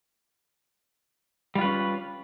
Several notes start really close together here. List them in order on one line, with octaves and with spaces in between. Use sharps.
G3 F4 B4 C#4